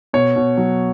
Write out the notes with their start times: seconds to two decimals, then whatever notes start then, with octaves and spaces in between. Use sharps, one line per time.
0.13 B2 C#5
0.36 B2
0.57 F#3